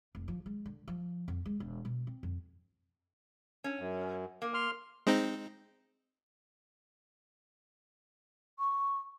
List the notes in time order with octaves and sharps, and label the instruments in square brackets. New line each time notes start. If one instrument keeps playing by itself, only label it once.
[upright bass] F1
F3
G#3
D3
F3
F2
G#3
E1
B2
C4
F2
[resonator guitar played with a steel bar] C#4
[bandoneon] F#2
[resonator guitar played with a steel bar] A#3
[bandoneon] C6 F6
[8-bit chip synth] G#3 C4 D#4
[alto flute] C#6